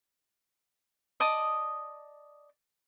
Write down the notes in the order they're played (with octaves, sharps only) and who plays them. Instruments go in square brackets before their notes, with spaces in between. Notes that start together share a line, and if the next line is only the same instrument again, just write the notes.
[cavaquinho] D5 D#5 A5 D#6